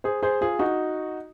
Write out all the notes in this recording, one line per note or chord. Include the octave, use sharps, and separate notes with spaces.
G#4 C5
G#4 C5
F4 G#4
D#4 F#4